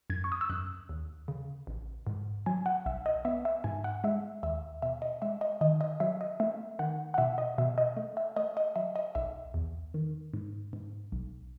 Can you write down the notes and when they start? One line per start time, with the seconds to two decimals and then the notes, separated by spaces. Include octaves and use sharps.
0.10 F#2 G#6
0.24 C#6
0.32 D#6
0.41 E6
0.50 F#2 F#6
0.89 D#2
1.28 C#3
1.67 A1
2.07 G#2
2.46 F#3 G#5
2.66 F#5
2.86 B1 E5
3.06 D#5
3.25 B3 E5
3.45 E5
3.64 G#2 G#5
3.84 F#5
4.04 G#3 E5
4.43 D#2 E5
4.82 B2 E5
5.02 D#5
5.22 G#3 E5
5.41 D#5
5.61 D#3 D#5
5.81 D#5
6.00 F#3 E5
6.21 D#5
6.40 A3 E5
6.79 D#3 F#5
7.14 F#5
7.18 B2 E5
7.38 D#5
7.58 B2 E5
7.78 D#5
7.97 A3
8.17 E5
8.36 A3 D#5
8.57 D#5
8.76 F#3 E5
8.96 D#5
9.15 B1 E5
9.54 E2
9.94 D#3
10.34 G#2
10.73 G#2
11.12 B1